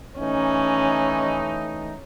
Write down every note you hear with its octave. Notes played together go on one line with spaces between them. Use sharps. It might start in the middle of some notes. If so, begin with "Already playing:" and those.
E3 A3 C#4 D#4